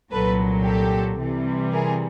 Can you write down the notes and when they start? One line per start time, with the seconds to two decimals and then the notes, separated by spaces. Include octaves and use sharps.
0.12 C2 A#2 F#3 A4 B4
0.65 G4 A4
1.19 C3 E3 G3
1.72 G#4 A#4